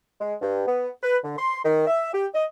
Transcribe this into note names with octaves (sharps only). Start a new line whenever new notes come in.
G#3
G2
B3
B4
D3
C6
D#3
E5
G4
D#5